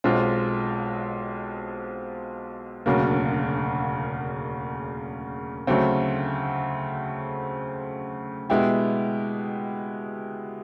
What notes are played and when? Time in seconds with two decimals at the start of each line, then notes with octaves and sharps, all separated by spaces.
0.04 B1 B2 G#3 C4 F4
2.86 E1 D2 C#3 F#3 A#3
5.67 D2 C#3 F#3 A3 C4
8.50 B2 G#3 B3 E4 G4